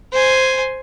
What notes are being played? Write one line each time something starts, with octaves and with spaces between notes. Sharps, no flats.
C5 G#5